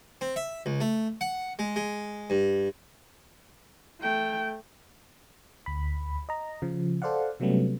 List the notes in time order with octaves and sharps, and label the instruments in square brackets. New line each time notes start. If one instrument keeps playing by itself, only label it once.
[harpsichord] C4
E5
C#2
A3
F#5
G#3
G#3
G2
[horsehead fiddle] A3 G5
[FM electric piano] D2 B5
D#5 A#5
C#3 F3
A4 C5 D5 F5 F#5
C3 F#3 G3 A3 B3 C#4